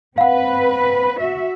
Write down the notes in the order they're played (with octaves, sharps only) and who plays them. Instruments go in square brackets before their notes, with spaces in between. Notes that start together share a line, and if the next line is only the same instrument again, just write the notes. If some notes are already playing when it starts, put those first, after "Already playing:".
[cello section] C4 B4 [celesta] F5 F#5
[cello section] F#4 E5